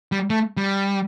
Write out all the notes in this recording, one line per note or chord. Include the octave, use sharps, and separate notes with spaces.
G3
A3
G3